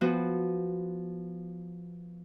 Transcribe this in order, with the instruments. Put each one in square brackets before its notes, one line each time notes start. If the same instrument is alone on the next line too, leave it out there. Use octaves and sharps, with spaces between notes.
[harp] F3 B3 F#4